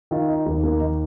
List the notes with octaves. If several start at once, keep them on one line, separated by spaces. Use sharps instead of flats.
D#3 F4
D#4
D#2 A#3
A#3
D#3 D#4